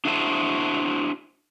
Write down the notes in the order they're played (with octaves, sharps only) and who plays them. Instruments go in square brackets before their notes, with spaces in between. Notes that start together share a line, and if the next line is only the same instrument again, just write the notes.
[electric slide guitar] D4 E4 F#4 G#4 C5 A5